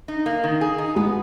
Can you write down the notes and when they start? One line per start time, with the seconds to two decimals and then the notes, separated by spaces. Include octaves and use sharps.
0.08 D#4
0.26 A#3
0.44 D#3
0.61 G#4
0.78 D#4
0.96 G#3 B3